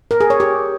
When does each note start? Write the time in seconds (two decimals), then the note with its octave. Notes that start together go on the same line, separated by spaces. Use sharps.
0.11 A#4
0.21 G#4
0.30 C#5
0.40 G4